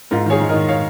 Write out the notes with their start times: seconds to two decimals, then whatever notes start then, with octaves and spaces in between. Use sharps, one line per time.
0.11 G#2 F4 A#4
0.26 D#3 G#4 C#5
0.40 G#2
0.49 D#3 A#4 D#5
0.68 C#5 F5